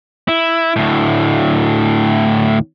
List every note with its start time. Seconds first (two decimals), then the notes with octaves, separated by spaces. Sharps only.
0.28 E4
0.76 D2 A2